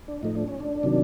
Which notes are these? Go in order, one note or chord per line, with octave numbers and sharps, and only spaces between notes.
D4
A2 F3 A3 D#4
D4
C#4
D4
C3 D#3 F#3